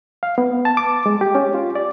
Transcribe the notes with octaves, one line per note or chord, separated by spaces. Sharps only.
F5
B3
A5
D6
G#3
G4
C#4
F4
D5